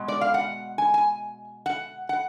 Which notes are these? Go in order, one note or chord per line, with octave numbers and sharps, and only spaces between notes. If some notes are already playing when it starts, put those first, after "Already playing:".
Already playing: B2 G#3
D5
F5
F#5
G#5
G#5
F#5
F#5